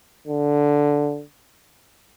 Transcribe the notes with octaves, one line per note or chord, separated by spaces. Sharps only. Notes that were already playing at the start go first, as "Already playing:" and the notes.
D3